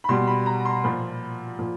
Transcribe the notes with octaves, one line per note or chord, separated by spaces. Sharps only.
B5
B2 G3 C6
B5
A#5
C6
A#2 F3 B5
A#2 F3